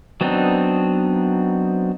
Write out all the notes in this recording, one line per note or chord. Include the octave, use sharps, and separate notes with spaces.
F#3 B3 C4 D4 D#4